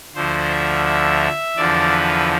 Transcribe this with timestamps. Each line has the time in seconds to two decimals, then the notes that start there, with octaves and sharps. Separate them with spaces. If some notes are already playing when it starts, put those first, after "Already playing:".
0.15 D2 D3 F3 C5
0.50 E5
0.86 E5
1.56 E2 D3 F3 D5
1.92 B4